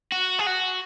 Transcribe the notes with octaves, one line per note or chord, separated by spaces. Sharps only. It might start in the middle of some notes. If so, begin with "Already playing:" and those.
F#4
G#4
F#4